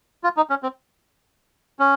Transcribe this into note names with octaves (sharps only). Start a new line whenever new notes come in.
F4
D#4
C#4
C4
C#4